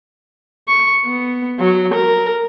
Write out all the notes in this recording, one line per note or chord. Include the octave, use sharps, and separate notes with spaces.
C#6
B3
F#3
A#4